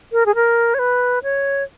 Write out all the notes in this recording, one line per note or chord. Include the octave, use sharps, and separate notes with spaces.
A#4
G#4
A#4
C#5
B4
C#5